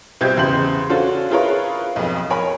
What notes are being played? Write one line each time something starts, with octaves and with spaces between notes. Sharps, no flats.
C2 B2 C4 G4 G6 G#6
E2 C#3 C6 F#7
C#4 D4 F4 F#4 A4 C5
E4 F4 G#4 A#4 B4 C#5
B1 F2
A#4 C#5 G#5 B5